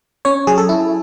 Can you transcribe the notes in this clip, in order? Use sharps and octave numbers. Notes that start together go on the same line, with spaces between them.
C#4 C#5
F#3 G#4
A4
E4